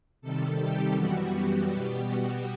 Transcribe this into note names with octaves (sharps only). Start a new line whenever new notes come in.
C3 D#3 G3 A4
G4
F#2 E3 G3 B3 F#4
G4
B2 G3 B3 G4
F#4